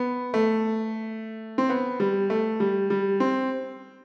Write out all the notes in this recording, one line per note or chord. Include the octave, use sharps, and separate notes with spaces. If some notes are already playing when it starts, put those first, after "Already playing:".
Already playing: B3
A3
C4
B3
G3
A3
G3
G3
C4